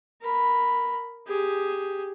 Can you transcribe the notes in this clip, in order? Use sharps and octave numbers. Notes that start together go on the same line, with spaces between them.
A#4 B5
G4 G#4